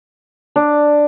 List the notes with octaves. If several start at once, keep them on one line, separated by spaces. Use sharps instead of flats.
D4